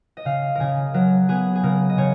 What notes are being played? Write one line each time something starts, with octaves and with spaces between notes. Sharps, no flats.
D#5
C#3 F5
C#3 G#4 A#4
F#3 A#4
B3 G#4
G#4
C#3 A#4
D#5
C#3 C#5